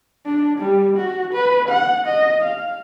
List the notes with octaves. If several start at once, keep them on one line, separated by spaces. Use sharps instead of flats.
D4
G3
F#4
B4
F#5
D#5
F5